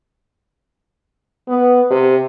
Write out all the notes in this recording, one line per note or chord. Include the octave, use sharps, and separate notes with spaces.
B3
C3